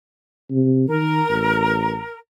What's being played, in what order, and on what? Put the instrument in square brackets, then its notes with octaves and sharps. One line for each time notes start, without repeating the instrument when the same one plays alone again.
[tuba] C3
[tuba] D#3 [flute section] A#4
[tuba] A1